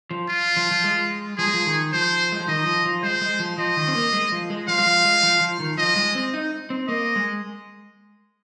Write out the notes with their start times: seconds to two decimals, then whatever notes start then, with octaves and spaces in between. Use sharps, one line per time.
0.11 F3
0.29 F4
0.57 F3
0.71 F3
0.84 G#3
1.38 F3 G#4
1.46 G#3
1.54 F3
1.67 D#3
1.93 F3 C5
2.32 G#3
2.40 F3
2.48 D#3 D#5
2.66 F3
2.86 F3
3.03 G#3 C5
3.21 G#3
3.40 F3
3.58 F3 D#5
3.77 D#3
3.88 C4
3.95 A#3
4.13 G#3
4.32 F3
4.50 G#3
4.68 F3 F5
4.78 G#3
4.86 F3
5.05 G#3
5.23 F3
5.41 F3
5.60 D#3
5.77 F3 D#5
5.96 G#3
6.15 C4
6.34 D#4
6.70 C4
6.88 A#3 D#5
7.16 G#3